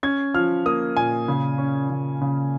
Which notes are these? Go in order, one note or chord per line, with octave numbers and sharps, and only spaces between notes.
C#4 G#6
F3 F6
A#3 D#6
A#2 G#5
C#3
C#4
C#3
C#3